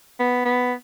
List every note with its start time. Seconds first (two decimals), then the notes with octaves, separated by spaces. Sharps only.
0.20 B3
0.45 B3